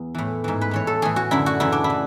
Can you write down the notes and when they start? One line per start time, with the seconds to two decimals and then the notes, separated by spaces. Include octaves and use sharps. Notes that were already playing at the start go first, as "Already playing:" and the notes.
Already playing: E2 B3
0.15 A2 E3
0.44 G#2 E3
0.61 B4
0.71 A2 E3 C#5
0.87 A4
1.02 A2 E3 G#4
1.16 F#4
1.31 F#2 D3 E4
1.46 F#4
1.60 F#2 C#3 E3 E4
1.72 D4
1.84 E4
1.90 E3